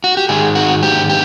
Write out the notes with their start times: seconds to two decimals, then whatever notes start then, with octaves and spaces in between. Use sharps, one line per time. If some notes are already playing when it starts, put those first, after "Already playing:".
0.04 F#4
0.17 G4
0.29 G#2 D#3 G#3 G#4
0.55 F#4
0.83 G4
1.10 G4